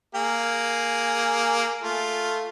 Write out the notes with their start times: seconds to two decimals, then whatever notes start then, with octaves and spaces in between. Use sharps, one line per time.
0.15 A#3 G#4
1.83 A3 F4